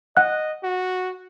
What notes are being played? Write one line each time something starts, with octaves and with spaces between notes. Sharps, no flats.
D#5 F#5 F#6
F#4